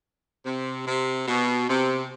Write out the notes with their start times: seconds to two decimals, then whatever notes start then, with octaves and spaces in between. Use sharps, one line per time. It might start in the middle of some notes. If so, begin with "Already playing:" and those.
0.45 C3
0.86 C3
1.28 B2
1.69 C3